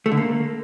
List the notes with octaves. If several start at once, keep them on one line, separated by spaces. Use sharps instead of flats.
A3
D3
A#3